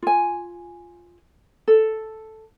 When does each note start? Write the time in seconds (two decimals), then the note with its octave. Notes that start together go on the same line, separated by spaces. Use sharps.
0.03 F4 G#5
1.68 A4